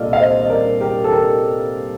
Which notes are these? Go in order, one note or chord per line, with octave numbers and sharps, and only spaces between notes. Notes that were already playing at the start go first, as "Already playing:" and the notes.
Already playing: C2 A#2 F4 A4 D5 D#5 F5
F5
C5 D#5
D#5
A#4 D5
G4 A#4
A4
G4 A#4